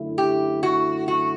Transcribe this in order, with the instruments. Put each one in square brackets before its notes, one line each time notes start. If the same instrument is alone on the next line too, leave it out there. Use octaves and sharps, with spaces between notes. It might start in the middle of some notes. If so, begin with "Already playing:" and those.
Already playing: [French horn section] F#2 D3 A3 E4
[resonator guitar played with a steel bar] G4
F#4
F#4